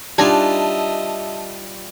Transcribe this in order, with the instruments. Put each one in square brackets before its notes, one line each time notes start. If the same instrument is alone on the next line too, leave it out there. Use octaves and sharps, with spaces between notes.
[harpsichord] G3 F4 [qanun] D4 D#4 G#5 [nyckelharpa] D#5 E5 [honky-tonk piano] A5